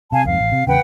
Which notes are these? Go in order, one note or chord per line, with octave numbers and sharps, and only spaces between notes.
C3 F5 G#5 A5
C2 F2 G#2 F5
A1
C3
E2 C#3 B4 F#5 G5